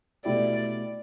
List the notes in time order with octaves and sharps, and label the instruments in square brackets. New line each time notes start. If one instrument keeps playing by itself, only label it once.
[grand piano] B2 A3 E4 G4 [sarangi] D5